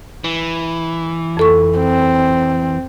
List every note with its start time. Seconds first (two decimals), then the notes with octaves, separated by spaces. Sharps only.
0.24 E3
1.37 F2 A4 C#6
1.79 C4